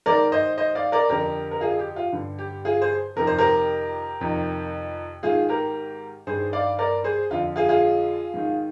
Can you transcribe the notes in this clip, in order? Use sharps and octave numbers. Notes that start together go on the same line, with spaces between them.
G#2 D#3 A#4 D5
C5 D#5
C5 D#5
D5 F5
A#4 D5
F2 D3 G4 A#4
A#4
F4 G#4
G4
F4
G2 D3
G4
F4 G#4
G#4 C5
F2 C3 D#3 A#4
C5
G4 A#4
F2 C3 D#3
G#2 D#3 F4 G#4
G4 A#4
G2 D#3 G#4 C5
D5 F5
A#4 D5
G#4 C5
F2 D3 F4
F4 G#4
F4 G#4
G#2 D#3